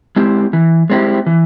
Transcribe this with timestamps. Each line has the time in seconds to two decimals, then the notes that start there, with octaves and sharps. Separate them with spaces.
0.16 G#3 C4 E4 G4
0.53 E3
0.90 G#3 C4 E4 G4
1.26 E3